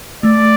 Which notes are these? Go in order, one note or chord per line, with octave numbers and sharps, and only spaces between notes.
A3 D5